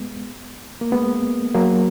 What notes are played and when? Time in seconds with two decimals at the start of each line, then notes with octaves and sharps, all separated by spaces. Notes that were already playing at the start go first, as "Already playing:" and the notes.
Already playing: G#3 B3
0.81 A#3
0.92 G#3 B3
1.54 F#3 A#3